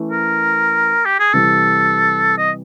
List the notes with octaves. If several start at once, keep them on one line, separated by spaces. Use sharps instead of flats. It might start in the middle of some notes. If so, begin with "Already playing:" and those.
Already playing: E3 A3 C#4 E4
A#4
G4
G#4
C3 E3 G3 A4
D#5